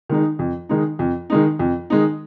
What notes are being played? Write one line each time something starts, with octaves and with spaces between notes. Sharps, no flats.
D#3 G#3 D#4
F2
D#3 G#3 D#4
F2
D#3 G#3 D#4
F2
D#3 G#3 D#4